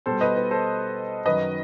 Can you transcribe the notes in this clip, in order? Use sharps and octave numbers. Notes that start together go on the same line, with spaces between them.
B2 G3 A4 C5
B4 D#5
B4
A4 C5
F#2 D#3 F#3 B4 D#5